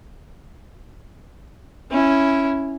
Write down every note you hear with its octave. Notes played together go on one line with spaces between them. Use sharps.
C#4 E4